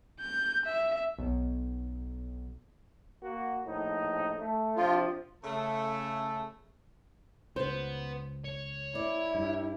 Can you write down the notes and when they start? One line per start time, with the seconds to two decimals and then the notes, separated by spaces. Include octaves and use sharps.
0.20 G6
0.66 E5
1.19 B1
3.21 A#3 F#4
3.65 A#1 A2 D#4
4.37 A3
4.76 C3 F3 D4 F4
5.44 C#3 A3 A4
7.56 C#2 B3 C5
8.44 C#5
8.95 E4 D5
9.35 G2